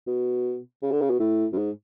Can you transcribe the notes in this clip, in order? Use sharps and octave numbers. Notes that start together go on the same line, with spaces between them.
B2
C#3
D3
C#3
B2
A2
F#2
G#2